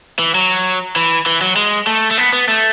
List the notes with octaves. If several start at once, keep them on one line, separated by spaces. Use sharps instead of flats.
E3
F#3
E3
E3
F#3
G#3
A3
A3
B3
B3
A3